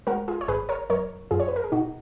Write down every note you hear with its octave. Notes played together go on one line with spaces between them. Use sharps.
G#3 F#4 A#4
F4 G#4
C#5
G#1 G#4 B4
A#4 C#5
F#2 A#4 C#5
F#2 F4 G#4
C#5
B4
A#4
G#4
B2 D#4 F#4